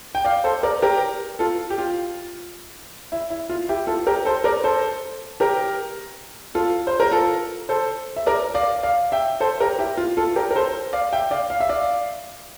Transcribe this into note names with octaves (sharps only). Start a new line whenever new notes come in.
G5
D5 F5
A4 C5
A#4 D5
G4 A#4
F4 A4
G4
F4
E4
E4
F4
E4 G4
F4 A4
G4 A#4
A4 C5
A#4 D5
A4 C5
G4 A#4
F4 A4
C5
A#4
F4 A4
A4 C5
E5
A#4 D5
D5 F5
D5 F5
E5 G5
A4 C5
G4 A#4
E4 G4
F4
F4 A4
G4 A#4
A#4
A4 C5
D5 F5
E5 G5
D5 F5
F5
E5
D5 F5